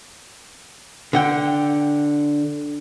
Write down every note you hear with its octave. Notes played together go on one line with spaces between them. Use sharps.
D3 F#5 G5